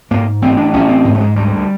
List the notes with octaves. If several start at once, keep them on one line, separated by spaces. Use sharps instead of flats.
G#2 A#3
A1 C4
D4
A1 C#4
C4
G#2 C4
A3
G#3
D2 G3